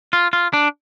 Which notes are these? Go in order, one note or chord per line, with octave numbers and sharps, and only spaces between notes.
F4
F4
D4